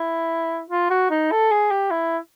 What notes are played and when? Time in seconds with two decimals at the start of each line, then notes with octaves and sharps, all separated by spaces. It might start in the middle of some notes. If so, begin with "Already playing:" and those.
Already playing: E4
0.70 F4
0.90 F#4
1.10 D#4
1.31 A4
1.51 G#4
1.71 G4
1.91 E4